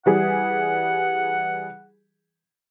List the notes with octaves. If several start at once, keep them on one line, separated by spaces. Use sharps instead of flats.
E3 G3 G#4 F#5